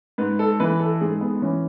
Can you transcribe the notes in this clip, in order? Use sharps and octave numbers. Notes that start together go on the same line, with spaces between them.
G#2 B4
A4
E3 B4
A4
G#2 G#4
B3
E3 C#4